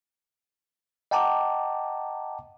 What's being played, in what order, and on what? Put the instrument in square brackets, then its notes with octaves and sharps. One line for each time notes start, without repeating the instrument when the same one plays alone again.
[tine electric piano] D#5 F#5 G5 A5 A#5 D6